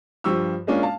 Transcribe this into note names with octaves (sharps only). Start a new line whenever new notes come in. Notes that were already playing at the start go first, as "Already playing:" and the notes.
G2 F3 G4 C#6 E6
G#3 A#3 C#4 D4 F4
F5 A5